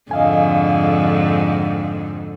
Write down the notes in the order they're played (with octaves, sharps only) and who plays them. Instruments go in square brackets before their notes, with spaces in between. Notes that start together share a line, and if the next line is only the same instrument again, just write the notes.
[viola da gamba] F2 G#2 D3 [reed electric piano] D#5 F5 G#5